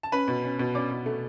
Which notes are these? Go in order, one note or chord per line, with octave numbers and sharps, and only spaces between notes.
A5
C#4 B4 B5
B2
C#4
B2
C#4 D5 D6
B2
A3